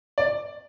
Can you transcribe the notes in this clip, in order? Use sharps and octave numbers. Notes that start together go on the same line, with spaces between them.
D5